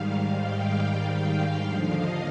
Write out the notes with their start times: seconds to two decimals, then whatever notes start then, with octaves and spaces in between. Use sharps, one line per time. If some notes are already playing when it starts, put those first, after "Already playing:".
Already playing: G#2 D#3 G3 F5
0.38 G5
1.62 D#2 D3 F3 F5
1.93 D#5